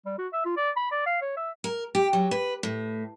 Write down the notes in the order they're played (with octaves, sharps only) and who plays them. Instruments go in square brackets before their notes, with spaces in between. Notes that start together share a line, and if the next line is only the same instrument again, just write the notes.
[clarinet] G3
F#4
E5
F4
D5
B5
D5
F5
C#5
E5
[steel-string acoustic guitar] A#4
G4
F#3
B4
A2